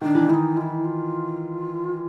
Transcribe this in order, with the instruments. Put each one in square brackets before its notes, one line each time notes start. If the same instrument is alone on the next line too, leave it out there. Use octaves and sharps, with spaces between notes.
[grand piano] D#3 [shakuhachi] D4
[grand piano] E3
[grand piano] D#3 [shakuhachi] E4
[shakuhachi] D#4
F4
E4
F4